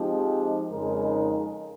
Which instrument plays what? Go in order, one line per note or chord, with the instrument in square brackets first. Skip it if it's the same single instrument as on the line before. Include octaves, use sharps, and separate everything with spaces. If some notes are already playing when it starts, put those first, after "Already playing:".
Already playing: [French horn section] F3 G#3 C4 D#4 G4
F2 C#3 G#3 D#4 A#4